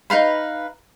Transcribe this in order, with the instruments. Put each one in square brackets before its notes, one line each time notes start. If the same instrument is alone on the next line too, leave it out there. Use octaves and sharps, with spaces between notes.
[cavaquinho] D#4 B4 F5 B5